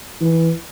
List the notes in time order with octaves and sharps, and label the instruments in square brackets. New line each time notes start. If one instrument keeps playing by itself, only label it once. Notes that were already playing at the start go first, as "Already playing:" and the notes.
[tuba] E3